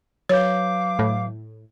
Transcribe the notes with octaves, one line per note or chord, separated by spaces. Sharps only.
F#3 B4 C#5 F5 D6 G6
A2